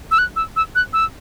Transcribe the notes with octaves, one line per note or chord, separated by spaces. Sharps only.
E6
F#6
E6
E6
F#6
E6